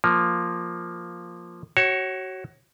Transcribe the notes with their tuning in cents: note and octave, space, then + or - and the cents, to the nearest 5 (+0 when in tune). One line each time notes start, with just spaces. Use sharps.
F3 +0 A#3 +0
F#4 +25 C#5 -15